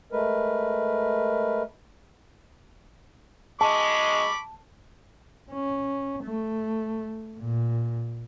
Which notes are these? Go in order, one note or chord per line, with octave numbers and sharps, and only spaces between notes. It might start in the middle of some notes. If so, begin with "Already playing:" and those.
G#3 A3 A#4 B4
G#3 A5 B5 C#6 D6
C#4
A3
A#2